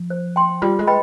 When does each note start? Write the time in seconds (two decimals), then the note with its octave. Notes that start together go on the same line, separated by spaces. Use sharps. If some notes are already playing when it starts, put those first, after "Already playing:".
Already playing: F3
0.10 C5
0.36 G5 C6
0.62 G3 F4
0.79 G#3
0.87 B4 D#5 G5 B5